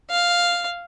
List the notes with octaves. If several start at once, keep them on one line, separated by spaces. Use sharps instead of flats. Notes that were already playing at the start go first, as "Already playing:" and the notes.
F5